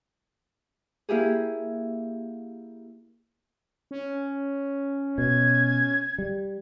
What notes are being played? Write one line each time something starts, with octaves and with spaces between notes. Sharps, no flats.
A#3 E4 G4 G#4
C#4
B2 G#6
G3